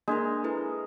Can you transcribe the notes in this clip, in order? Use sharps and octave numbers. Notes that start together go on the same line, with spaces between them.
G#3 A#3 D4 A#4
E4 A4 B4